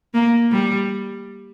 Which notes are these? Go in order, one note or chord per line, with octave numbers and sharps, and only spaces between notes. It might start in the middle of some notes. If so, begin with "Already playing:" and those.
A#3
G3